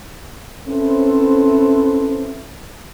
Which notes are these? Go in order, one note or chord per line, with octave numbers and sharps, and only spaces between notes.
C4 C#4 E4 A4 B4 C5